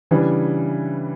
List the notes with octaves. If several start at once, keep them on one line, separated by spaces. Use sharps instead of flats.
C#3 E3 G3 D4